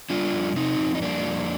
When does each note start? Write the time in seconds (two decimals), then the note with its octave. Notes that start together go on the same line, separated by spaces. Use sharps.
0.10 G3 D4 F4
0.33 F2
0.56 C3 C4 D#4
0.79 F2
0.95 D#4
1.02 G3 A#3 D4
1.25 F2